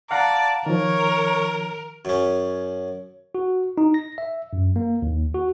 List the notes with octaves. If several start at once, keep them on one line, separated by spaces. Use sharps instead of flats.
D5 F5 F#5 A5 A#5
D#3 F3 A#4 C#5
F#2 C#4
F#4
D#4
A#6
E5
F#2
A#3
D#2
F#4